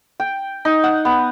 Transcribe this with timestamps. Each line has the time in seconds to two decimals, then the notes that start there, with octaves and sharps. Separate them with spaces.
0.20 G5
0.65 D#4
0.84 F#5
1.05 B3